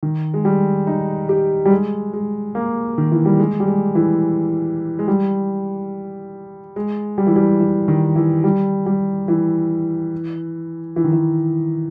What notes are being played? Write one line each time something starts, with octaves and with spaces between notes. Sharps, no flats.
D#3
G#3
G3
D#4
G4
G3
G#3
G#3
A#3
D#3
E3
G3
G#3
G3
G#3
E3
G#3
G3
G#3
G3
E3
G3
E3
D#3
E3
G3
G3
E3
E3
D#3
E3